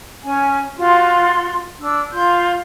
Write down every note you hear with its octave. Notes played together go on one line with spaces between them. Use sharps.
C#4 G#5
F4 F#4 C6
D4 E6
F4 C6 G6